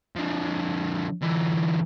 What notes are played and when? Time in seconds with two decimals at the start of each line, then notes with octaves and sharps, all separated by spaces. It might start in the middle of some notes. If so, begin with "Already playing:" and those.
0.16 D3 F3
1.22 D3 E3